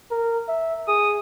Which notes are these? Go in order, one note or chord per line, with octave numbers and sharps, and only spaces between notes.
A#4
E5
G#4 D#6